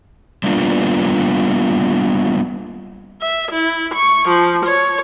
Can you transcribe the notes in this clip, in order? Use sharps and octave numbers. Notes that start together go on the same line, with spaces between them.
G3 A#3 B3 D4 F4
E5
E4
C#6
F3
C#5